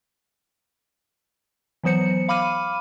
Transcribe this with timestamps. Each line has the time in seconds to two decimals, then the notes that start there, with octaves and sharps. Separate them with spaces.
1.83 E3 F#3 B3 C5 C#7
2.29 F5 B5 D6 F6 D#7